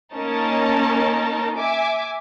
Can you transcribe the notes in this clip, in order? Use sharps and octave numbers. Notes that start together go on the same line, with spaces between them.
A#3 C#4 D#4 A#4 A5
E5 G#5 D6